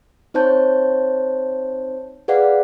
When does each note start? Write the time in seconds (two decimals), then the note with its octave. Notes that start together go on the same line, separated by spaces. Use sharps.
0.34 C4 D#4 C5 C#5 A5 G6
2.28 G#4 B4 D5 F5 F#5